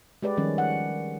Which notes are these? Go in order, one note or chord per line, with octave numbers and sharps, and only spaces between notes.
G#3 G4 B4 D5
D#3 F3 G3 C#4
F#5